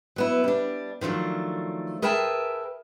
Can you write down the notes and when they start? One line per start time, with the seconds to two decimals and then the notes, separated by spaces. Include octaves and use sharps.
0.16 F#3 B3 E4
0.44 G3 D4
1.01 D#3 F3 F#3 A3 D4
2.02 G#4 A#4 B4 E5 G5 A5